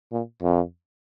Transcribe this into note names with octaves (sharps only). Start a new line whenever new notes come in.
A#2
F2